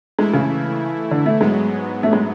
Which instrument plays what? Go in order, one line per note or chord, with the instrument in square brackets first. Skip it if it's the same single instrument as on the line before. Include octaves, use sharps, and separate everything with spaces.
[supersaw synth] E3 A3 E4 [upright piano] G#3
[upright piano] C#3
D3
A3
[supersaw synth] G#2 F#3 B3 [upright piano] G#3
[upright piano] A3
G#3